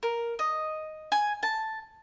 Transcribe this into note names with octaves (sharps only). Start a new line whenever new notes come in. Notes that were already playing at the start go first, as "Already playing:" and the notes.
A#4
D#5
G#5
A5